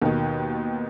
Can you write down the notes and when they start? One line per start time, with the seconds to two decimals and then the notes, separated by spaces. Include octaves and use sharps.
0.02 D#2 B2 D#3